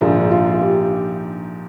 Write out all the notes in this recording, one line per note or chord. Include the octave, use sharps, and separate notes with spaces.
A#1 G#2 D#3 A#3 D4 F4 G#4
F4
F4
G4